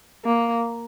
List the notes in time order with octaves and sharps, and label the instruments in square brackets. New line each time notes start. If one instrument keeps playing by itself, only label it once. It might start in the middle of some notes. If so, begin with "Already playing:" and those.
[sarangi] A#3